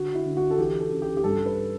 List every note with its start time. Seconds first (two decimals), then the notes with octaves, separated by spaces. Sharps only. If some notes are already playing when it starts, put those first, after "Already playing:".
Already playing: D3 F#4
0.14 E4
0.25 D3
0.37 F#4
0.51 A4
0.58 E3 G4
0.80 A4
0.91 C#3
1.02 G4
1.17 G4
1.24 G2 A4
1.46 B4